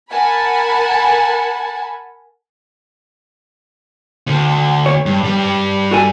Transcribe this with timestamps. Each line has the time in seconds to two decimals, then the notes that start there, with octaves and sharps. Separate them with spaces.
0.10 A#4 F#5 G#5 A5 B5
4.27 D2
4.86 C#5
5.06 G2
5.23 G2 G3
5.91 F#4 A4 G#5